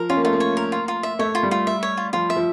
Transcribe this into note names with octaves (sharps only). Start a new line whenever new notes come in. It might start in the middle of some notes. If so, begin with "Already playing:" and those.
Already playing: F3 A#4
C#4 F4
A#3
A3 F4
A#3
C#5
A#4
F4
F4
E5
A3 C#5
F4
G3
F4
E5
C#5
F4
F3 F4
E5
F3